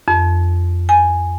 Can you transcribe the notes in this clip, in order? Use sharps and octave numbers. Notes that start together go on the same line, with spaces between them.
F2
G#5